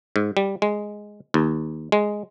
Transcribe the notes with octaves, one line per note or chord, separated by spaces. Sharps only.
G#2
G3
G#3
D#2
G#3